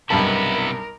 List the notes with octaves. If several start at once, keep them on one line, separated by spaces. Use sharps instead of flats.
B1 G2 C3 B3 E4 A#4 A5